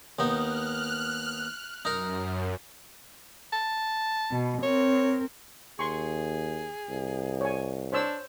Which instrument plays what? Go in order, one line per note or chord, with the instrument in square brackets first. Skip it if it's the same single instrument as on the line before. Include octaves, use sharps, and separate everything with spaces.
[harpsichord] D#2 B3 D#4 [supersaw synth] F6 F#6
[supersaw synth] F#2 [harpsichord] D#4 A#4
[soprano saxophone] A5
[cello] B2
[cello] C4 A#4 [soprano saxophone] C#5
[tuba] D#2 [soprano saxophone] G#4 [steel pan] C6 C#6
[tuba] C2
[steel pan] C#5 G#5
[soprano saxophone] D4 [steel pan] C5 C#5 E6